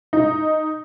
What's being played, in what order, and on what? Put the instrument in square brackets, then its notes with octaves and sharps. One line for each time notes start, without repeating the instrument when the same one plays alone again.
[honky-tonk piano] D#4